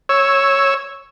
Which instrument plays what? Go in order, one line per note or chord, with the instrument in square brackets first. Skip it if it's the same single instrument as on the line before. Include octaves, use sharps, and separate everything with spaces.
[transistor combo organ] C#5 E6